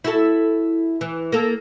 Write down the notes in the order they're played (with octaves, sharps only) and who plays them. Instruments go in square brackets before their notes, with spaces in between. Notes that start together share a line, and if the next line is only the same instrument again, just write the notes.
[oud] E4 F#4 A4
E3
A#3 A4